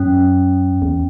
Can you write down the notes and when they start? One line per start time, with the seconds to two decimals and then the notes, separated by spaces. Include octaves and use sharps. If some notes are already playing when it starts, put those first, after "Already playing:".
Already playing: F#2 C#4
0.82 E2